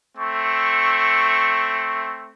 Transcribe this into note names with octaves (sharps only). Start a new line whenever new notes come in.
A3 C4 C#6